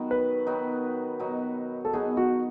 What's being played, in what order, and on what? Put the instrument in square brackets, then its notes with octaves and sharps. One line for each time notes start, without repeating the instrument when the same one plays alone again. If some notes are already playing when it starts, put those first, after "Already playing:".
Already playing: [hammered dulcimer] D#3 F#3 B3 D#4
[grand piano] B4
[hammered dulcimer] D#3 F#3 B3 D#4
B2 F#3 B3 D#4
[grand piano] A4
[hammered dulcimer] B2 F#3 B3 D#4 [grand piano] G#4
[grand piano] F#4